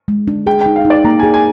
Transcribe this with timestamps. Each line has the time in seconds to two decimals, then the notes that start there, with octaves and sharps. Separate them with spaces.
0.08 G#3
0.28 D4
0.47 G#4 G5
0.61 D#4 G5
0.76 F5
0.85 D#4
0.90 D5
1.05 A#3 A#5
1.19 G#4 G#5
1.34 G#5